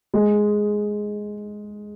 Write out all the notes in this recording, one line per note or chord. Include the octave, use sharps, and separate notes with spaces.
G#3